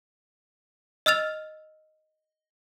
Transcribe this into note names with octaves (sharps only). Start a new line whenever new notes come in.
D#5 E6 F6 A6 F7